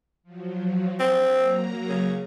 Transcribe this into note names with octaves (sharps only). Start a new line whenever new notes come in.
F3 F#3
C4 D4 G4
F#3 A#3 A#5
C#3